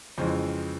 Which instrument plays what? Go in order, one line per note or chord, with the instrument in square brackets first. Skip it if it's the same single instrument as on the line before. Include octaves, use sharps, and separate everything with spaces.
[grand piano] F2 C#3 E3 G#3 C5